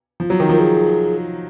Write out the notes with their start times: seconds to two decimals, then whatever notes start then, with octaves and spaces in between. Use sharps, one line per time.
0.20 F3
0.30 F#3
0.40 D#3
0.49 F3 A#4
0.59 G#4